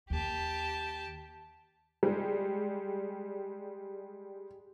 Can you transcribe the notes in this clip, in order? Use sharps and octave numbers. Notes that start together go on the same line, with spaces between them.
D#2 G4 A5
G3 G#3